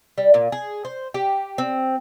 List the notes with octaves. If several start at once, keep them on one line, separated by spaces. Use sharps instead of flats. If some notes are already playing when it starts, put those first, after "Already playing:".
G3
A#2
G#4
C5
G4
C4